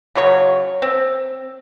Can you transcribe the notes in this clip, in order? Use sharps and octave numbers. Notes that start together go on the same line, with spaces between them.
C#3 F#3 C#5 C#6
C4